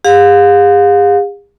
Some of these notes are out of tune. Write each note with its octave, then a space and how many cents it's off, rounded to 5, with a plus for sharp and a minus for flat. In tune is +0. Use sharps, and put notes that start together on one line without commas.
G#4 -45 F5 +35